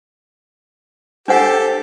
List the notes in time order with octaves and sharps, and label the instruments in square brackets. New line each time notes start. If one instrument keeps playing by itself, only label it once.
[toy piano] D4 C5 F#5 [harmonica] G4 A4